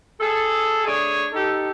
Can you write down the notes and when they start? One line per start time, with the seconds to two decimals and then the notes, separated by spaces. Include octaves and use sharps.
0.21 G#4 A4
0.86 A3 D4 G#4 C#5
1.33 D#4 G4 A4